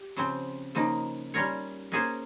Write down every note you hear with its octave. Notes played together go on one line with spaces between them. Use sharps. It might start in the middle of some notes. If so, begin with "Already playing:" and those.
Already playing: G4
C#3 F3 C4
C#3 F3 A#3 D#4
G3 C#4 F4 A#4 C#5
A#3 C#4 G#4 C5